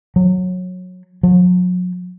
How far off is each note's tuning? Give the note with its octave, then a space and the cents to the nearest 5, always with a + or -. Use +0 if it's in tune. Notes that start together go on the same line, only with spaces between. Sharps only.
F#3 -20
F#3 -40